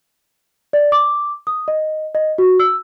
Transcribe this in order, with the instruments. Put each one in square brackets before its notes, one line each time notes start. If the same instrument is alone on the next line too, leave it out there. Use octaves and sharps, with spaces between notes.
[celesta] D5
D6
D#6
D#5
D#5
F#4
E6